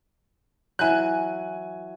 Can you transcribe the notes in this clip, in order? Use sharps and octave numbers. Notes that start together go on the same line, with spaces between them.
E3 F#3 G#5 F#6